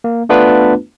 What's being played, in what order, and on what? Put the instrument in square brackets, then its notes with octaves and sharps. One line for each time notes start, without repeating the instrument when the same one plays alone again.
[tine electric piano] A#3
A3 B3 D4 F4 B4